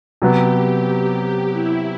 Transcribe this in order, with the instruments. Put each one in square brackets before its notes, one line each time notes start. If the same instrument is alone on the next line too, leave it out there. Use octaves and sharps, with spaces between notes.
[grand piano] C3 F#3 B3 [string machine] G4
[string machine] E4